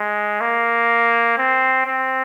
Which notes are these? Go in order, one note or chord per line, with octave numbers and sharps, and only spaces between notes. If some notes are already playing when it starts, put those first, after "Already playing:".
Already playing: G#3
A#3
C4
C4